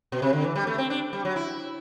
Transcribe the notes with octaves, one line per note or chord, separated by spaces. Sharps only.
B2
C3
D3
E3
G3
A3
C4
D4
G3
F#3
E4